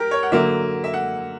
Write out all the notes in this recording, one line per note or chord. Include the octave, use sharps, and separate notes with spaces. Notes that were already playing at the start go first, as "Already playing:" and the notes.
Already playing: G4 A#4
C#5
F#5
D3 F#3 A#3 E5
E5
F#5